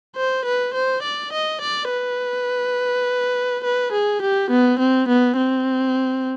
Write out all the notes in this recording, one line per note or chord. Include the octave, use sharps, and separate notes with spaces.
C5
B4
C5
D5
D#5
D5
B4
B4
G#4
G4
B3
C4
B3
C4